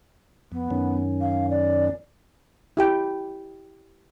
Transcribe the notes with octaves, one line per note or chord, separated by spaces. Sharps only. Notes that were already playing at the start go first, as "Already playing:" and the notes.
F2 B3
F#2 D#3 C#4
F5
D5
E4 G4 G5